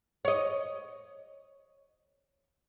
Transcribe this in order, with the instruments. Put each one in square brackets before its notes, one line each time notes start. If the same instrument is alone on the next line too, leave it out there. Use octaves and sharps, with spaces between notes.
[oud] C#5 D#5